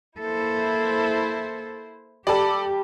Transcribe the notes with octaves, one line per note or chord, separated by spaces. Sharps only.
A#3 E4 A4 C5
G3 G4 A4 D5 A5